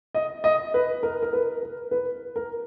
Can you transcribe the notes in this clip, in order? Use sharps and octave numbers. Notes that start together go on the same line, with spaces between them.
D#5
D#5
B4
A#4
A#4
B4
A#4
B4
A#4